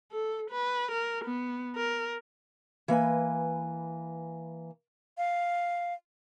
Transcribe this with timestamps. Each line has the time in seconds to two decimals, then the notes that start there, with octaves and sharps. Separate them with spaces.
0.12 A4
0.50 B4
0.92 A#4
1.25 B3
1.76 A#4
2.88 E3 A#3 B4 G#5
5.18 F5